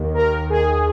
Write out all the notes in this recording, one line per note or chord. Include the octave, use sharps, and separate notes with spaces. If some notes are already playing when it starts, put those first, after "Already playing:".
Already playing: D#2 D#3
A#4
G#4